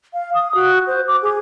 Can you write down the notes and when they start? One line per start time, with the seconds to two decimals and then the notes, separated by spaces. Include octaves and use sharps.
0.13 F5
0.35 D#6
0.55 F#4
0.87 C5
1.08 D6
1.22 G#4